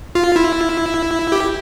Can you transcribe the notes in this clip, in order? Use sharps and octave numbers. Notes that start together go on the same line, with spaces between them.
F4
E4
G4